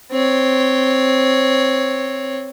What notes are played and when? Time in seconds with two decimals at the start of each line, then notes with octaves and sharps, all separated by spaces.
0.12 C4 C#5